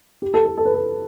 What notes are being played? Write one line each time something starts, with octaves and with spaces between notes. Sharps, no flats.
G4
A4
A4
A4
B4
A4